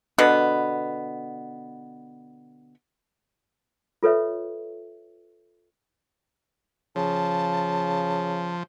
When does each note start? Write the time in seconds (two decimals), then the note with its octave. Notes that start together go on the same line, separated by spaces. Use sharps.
0.18 B2 D3 B3
4.03 F4 A4 B4 C#5 E5
6.96 C#3 F3 A5